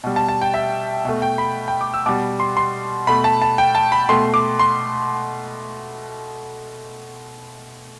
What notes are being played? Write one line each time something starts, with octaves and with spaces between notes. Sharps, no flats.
B2 G3
A5
A5
G5
E5
B2 A3
G5
B5
G5
D6
E6
B2 G3 D6
C6
C6
B2 A3 B5
A5
A5
G5
A5
B5
B2 A3 C6
D6
C6